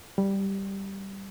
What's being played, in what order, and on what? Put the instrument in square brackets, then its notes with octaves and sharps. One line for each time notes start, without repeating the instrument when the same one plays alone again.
[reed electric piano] G3